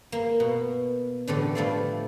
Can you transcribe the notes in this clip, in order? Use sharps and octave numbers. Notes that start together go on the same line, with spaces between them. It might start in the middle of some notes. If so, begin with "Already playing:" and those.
A#3
B2
A2 D3 E3 A3 G4 A4
F3 A3 D4 E4 D5 F5